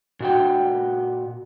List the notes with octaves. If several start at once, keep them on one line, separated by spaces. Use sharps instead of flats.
A#2 F#4 G5